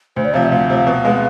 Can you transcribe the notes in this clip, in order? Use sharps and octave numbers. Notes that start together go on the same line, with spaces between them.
D2 C5
D5
C3 F3 F5
E5
D2 F5
C3 F3
B2
G#3 B3